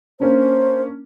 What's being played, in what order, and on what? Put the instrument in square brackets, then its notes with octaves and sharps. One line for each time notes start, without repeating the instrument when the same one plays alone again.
[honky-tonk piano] A#3 C#4 D4 [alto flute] C5